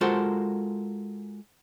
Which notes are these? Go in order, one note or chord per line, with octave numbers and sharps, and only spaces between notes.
G#3 F4 F#4 A4 A#4 C5